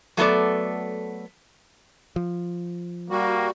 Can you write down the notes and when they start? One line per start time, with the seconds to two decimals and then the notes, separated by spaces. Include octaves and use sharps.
0.17 F#3 A3 B3 A4 D5
2.16 F3
3.10 G3 A#3 F#4